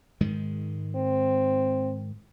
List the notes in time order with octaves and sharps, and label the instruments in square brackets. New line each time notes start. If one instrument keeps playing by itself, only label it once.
[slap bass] G#2 D#3 G#3
[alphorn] C4